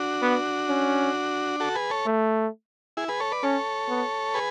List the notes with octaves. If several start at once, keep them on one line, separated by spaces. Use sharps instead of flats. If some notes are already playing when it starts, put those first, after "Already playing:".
Already playing: D4 F#4
B3
C#4
F#4 A4
G#4 B4
A4 C#5
A3
E4 G#4
G#4 B4
A4 C#5
B4 D5
C#4 A4 C#5
B3
G#4 B4